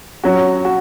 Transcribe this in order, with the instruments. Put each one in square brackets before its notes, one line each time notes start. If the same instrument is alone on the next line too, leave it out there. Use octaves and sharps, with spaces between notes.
[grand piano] F#3 C#4 F#4
F#4